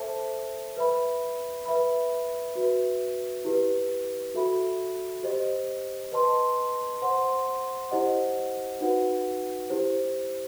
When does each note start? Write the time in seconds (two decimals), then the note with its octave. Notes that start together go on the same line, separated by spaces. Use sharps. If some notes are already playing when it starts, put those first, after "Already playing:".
Already playing: A4 C5 E5 A5
0.77 B4 E5 B5
1.65 B4 E5 B5
2.55 F#4 B4 E5
3.45 E4 G4 B4
4.34 F#4 A4 E5 B5
5.23 G4 C5 D#5
6.12 B4 D#5 A5 C6
7.02 C5 F#5 C6
7.91 E4 G4 C5 D#5 F#5
8.81 D#4 F#4 B4 F#5
9.70 E4 G4 C5